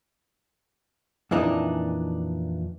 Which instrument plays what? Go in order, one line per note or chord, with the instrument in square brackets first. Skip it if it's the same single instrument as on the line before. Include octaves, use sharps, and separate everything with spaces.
[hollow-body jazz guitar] F2 A#2 E3 D4 D#4